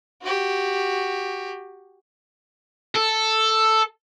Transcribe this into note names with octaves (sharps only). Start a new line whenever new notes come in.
F#4 G4
A4